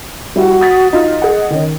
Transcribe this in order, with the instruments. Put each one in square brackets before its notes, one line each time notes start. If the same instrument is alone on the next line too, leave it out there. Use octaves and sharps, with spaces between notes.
[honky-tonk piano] G3 E4 [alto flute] F#4
[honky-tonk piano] D#6 A6 B6
[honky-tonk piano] D#4 F4 F#4 [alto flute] D#5
[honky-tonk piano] G#4 F#5
D#3 C#4